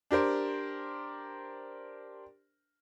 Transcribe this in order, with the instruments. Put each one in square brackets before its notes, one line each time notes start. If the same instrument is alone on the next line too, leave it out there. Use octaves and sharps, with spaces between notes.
[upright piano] D4 G4 A#4 C5